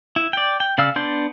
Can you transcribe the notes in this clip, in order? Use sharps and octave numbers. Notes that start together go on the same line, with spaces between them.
E4
D5 G5
G5
C#3 D5 F5 E6
B3 D4 D5 C6 G6